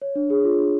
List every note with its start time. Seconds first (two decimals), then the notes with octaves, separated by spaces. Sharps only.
0.02 C#5
0.16 D4
0.30 G#4
0.44 F4
0.59 D4